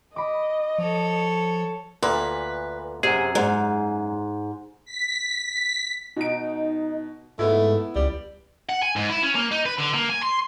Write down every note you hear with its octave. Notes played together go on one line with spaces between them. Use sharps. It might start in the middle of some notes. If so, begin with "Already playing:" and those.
D#5 B5 D6
F3 A4 C#5
D2 A#2 B4
F#2 C3 G#4
G#2
B6
B2 D#4 D7
G#2 A3 B3 E4
C#2 G3
F#5
G#5
G#2
E4
C#4
A#3
D#4
B4
D3
A#3
G#5
C6